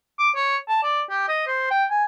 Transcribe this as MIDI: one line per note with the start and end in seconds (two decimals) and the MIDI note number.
0.19 0.30 86
0.36 0.57 73
0.69 0.80 81
0.83 1.02 74
1.10 1.25 67
1.29 1.45 75
1.47 1.68 72
1.70 1.85 79
1.90 2.05 80